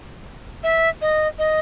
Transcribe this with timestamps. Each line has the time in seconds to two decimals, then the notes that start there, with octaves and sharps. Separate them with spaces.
0.63 E5
1.01 D#5
1.38 D#5